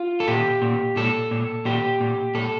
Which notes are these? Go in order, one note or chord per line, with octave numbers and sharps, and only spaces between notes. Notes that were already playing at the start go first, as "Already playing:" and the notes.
Already playing: F4
A4
A#2 G4
A#2
A#2 A4
A#2
A#2 G4
A#2
A#2 A4